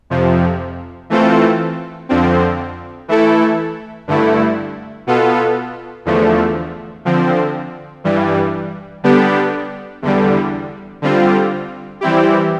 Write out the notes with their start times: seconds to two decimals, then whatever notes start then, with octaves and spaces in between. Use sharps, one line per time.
0.10 F2 C3 F3
1.10 E3 A3 C4 F4 A4
2.09 F2 D3 F3 C4
3.08 E3 A3 E4 A4
4.08 G2 D3 A3 E4
5.07 B2 B3 F4 A4
6.05 E2 D3 F3 A3
7.05 D3 F3 C4
8.04 G2 E3 G3
9.03 D3 G3 B3 D4 G4
10.02 E2 D3 G3
11.02 D3 G3 C4 F4
12.01 E3 G3 C4 E4 G4